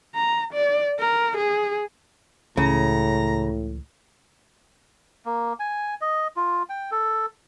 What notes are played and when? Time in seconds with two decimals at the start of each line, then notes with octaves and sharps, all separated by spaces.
0.15 A#5
0.54 D5
1.00 A#4
1.38 G#4
2.57 C#2 A2 C#3 E3 A#5
5.25 A#3
5.60 G#5
6.01 D#5
6.36 F4
6.69 G5
6.91 A4